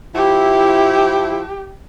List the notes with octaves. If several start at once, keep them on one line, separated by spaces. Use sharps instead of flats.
F3 E4 G4